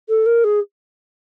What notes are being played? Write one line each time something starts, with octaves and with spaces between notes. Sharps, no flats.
A4
A#4
G#4